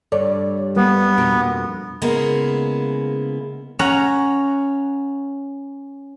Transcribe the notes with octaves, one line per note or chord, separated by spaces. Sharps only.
G2 A4 C#5 D5
G3 A#3 B3 B4
F2 B2 A#4
C#3 G#3 A#3 B3 E4
C#4 F#5 A#5